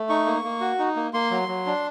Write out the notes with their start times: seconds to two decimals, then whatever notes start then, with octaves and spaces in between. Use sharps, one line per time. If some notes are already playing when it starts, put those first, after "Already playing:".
Already playing: A3
0.09 D#4 C#6
0.26 A#3
0.44 A#3
0.61 F#4
0.79 D#4
0.96 A#3
1.13 A#3 C6
1.31 F#3
1.48 F#3
1.66 D4